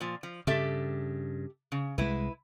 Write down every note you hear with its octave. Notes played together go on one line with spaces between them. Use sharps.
A#2 F3
F3
G2 C#3 G4 A4 E5
C#3
C2 G#3 E4 B4